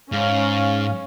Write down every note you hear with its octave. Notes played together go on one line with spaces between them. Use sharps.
G#2 C#4 F5